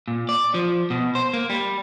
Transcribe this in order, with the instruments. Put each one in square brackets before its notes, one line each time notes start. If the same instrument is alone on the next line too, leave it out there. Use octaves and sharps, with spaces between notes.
[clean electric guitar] A#2
D5
F3
B2
C5
A#3
G3